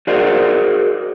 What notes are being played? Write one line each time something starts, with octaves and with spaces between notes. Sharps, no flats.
F#4 G#4 A#4 C5 D5